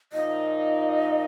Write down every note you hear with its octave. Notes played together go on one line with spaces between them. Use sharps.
A#2 F3 A#3 D#4 D#5